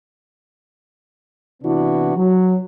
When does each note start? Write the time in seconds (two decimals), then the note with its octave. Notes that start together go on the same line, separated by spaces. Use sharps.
1.63 C3 E3 B3 D4 E4 F#4
2.16 F#3